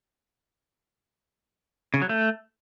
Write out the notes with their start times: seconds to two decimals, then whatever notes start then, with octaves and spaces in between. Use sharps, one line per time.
1.94 C#3
2.02 F#3
2.09 A3